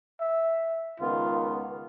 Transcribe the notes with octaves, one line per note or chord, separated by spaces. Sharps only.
E5
C#2 D#3 B3 F4